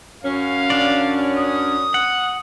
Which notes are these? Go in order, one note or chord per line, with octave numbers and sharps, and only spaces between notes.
F#2 C#4 F5
D4 D5
D#6
F#5